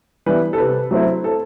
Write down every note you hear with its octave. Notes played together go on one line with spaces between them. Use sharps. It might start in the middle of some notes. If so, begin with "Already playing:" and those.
E3 G3 B3 E4 B4
A4
C3 B4
F#3 A3 C4 E4
A4